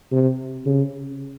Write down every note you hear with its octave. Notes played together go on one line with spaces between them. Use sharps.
C3
C#3